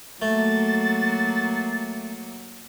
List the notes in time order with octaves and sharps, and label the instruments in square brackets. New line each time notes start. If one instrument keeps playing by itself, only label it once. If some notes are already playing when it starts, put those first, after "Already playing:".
[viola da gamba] F#3 A#3 [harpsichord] A3 [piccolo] A6